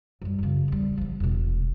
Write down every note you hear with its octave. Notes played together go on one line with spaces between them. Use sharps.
F#2 G3
F#2 C#3
E2 G3
F3 B3
E1 B2